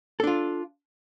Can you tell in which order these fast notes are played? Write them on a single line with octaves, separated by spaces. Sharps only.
A4 D4 F4